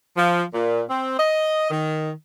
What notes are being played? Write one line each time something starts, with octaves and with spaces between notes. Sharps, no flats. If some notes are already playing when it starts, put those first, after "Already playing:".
F3
A#2
C4
D#5
D#3